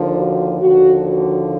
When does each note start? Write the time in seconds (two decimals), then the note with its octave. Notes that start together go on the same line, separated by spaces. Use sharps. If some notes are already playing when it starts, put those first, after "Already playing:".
Already playing: D#2 D3 F3
0.16 F#4
0.60 D#2 D3 F3 F#4
1.07 F#4